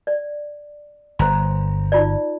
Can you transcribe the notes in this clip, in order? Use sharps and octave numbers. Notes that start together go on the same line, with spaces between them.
D5
G1 C5 A#5 C6
D#4 F4 D5